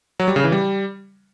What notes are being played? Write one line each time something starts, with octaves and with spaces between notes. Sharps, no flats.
F#3
G3
C#3
E3
G3